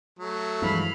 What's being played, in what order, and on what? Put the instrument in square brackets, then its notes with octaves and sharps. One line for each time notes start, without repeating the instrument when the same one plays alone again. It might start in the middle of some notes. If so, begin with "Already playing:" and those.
[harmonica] F#3 A3
[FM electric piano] G2 E3 G#3 [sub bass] F3 [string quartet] F5 B5